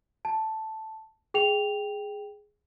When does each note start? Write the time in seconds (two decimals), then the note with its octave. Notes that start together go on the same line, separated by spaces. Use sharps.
0.25 A5
1.34 G#4 G5 F7